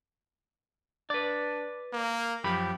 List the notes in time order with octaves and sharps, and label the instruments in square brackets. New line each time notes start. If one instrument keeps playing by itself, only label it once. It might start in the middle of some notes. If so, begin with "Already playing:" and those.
[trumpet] D4 [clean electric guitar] B4 D5
[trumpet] A#3
[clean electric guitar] F#2 F3 B5 [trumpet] G4